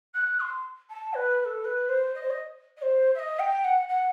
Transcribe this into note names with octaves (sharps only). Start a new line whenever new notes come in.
F#6
C6
A5
B4
B4
A4
B4
C5
D#5
C5
D#5
D#5
C5
E5
D#5
G5
F#5
F#5